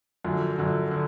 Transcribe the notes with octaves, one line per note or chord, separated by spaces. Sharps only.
F#2 D3 F3
F#2 D3 F3
D3